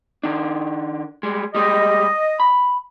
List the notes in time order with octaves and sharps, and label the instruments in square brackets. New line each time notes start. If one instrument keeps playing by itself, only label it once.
[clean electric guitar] D#3 D4
G3 G#3
[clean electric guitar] G3 G#3 G4 [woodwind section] D#5
[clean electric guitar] B5